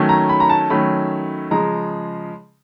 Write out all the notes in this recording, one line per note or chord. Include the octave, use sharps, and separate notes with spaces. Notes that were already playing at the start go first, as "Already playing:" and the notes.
Already playing: D#3 F#3 A3 C#4
A#5
B5
A#5
A5
D#3 F#3 A3 C#4 B5
C#3 F3 G#3 A#5